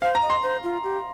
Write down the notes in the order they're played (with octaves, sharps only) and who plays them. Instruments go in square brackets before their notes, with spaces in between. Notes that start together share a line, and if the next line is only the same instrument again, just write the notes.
[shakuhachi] C5 [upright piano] F5
[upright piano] A#5
[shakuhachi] D#5
[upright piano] C6
[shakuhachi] C5
F4
G4